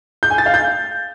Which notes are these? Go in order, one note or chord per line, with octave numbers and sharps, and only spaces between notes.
G6
G#5
A6
F5
G6